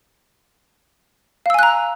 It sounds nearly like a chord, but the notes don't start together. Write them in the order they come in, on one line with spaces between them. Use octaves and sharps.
F5 E6 G#5 F#6 A#5